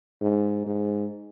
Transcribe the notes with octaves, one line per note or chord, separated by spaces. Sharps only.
G#2
G#2